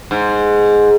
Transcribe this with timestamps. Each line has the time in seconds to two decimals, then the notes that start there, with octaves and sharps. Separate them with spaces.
0.11 G#2